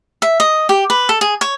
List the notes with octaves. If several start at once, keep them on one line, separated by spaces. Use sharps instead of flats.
E5
D#5
G4
B4
A4
G#4
C#5